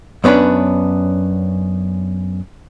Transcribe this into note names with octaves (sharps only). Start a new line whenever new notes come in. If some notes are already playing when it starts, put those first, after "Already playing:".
F#2 B3 C#4 D4 B4